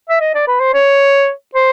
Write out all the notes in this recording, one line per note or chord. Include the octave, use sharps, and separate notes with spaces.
E5
D#5
D5
B4
C5
C#5
C5